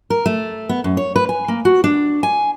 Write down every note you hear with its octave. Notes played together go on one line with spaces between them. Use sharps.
A#4
A3
B3
F#2
C#5
B4
G#5
A#3
F#4
D4
G#5